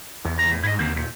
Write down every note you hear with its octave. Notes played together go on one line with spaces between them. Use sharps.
E2 E3
C#2 A#5
A2
G#2 E4 D#5
D#2 D3 A#3 C4
C#2 A#2